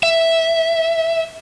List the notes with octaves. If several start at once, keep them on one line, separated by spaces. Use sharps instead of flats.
E5